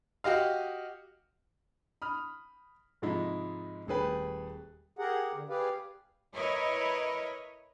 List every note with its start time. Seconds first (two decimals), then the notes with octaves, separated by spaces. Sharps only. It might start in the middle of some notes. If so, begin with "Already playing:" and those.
0.24 F#4 G4 D#5 F5
2.02 B5 D#6 F6
3.02 G#2 C3 F3 G#3 D#4 E4
3.87 D#1 A3 G#4 B4 G5
4.99 G4 G#4 A#4 F#5
5.34 D3
5.49 G4 G#4 B4 D5 F5
6.34 E4 A#4 B4 C#5 D#5